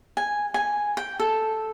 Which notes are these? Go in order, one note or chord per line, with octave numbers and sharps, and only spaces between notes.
G#5
G#5
G5
A4